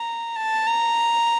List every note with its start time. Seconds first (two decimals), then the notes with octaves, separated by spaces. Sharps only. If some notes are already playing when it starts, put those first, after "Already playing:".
Already playing: A#5
0.36 A5
0.67 A#5